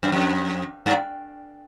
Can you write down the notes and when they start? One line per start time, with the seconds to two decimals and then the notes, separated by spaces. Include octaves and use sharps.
0.03 F#2
0.12 F2
0.86 G2